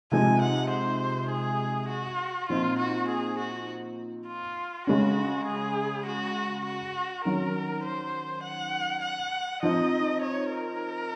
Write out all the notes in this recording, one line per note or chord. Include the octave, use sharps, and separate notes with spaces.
C3 F3 G#3 D#4 G#5
F#5
C5
G#4
F#4
A#2 F3 C4 D#4 F4
F#4
G#4
F#4
F4
C#3 G#3 C#4 F#4
G#4
F#4
F#4
D#3 F#3 C#4 A#4
C5
F#5
F#5
F3 C4 D#4 D#5
C#5
A#4